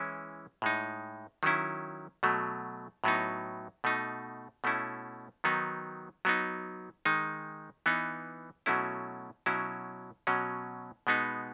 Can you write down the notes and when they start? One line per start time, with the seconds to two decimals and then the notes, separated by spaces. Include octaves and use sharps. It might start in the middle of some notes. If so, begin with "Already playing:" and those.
Already playing: E3 G#3 C#4 E4
0.62 A2 G#3 D#4
1.43 D#3 F#3 C#4 E4
2.23 B2 F#3 A3
3.04 A2 F#3 B3 D#4
3.84 B2 A3 D#4
4.64 B2 A3 C#4 E4
5.44 D#3 F#3 B3 D#4
6.25 F#3 B3 D#4
7.05 D#3 G#3 D#4
7.86 E3 B3 D#4
8.66 B2 F#3 A3 C#4 E4
9.46 B2 F#3 C#4 E4
10.27 B2 F#3 C#4
11.07 B2 G#3 B3 D#4